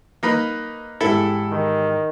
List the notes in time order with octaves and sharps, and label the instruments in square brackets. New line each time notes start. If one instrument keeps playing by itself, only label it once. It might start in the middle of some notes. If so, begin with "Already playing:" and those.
[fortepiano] A#3 D#4 B4
[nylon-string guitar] E2 G#2 G4 [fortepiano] E4 A4
[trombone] D#3